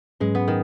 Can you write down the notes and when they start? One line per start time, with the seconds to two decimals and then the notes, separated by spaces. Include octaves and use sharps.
0.20 G#2 F#3 G#3 C#4 B4
0.35 B3
0.48 D#3